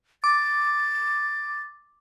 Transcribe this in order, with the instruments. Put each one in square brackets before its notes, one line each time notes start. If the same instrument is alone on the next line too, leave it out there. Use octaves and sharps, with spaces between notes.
[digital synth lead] D6 [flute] A6